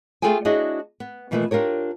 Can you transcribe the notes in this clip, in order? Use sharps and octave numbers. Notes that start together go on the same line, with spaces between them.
A3 F4 G#4 A4 G5 G#5
D4 E4 F#4 G#4 C#5 D#5
B3
B2 E3 F3 A3 A#3 B4
D4 F4 G4 A#4 C#5